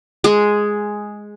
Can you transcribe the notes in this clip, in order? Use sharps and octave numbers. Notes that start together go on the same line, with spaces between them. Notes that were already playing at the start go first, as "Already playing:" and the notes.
G#3 G#4